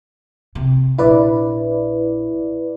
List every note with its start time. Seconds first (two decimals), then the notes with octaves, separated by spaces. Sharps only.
0.55 C3
0.98 A#1 E4 B4 D5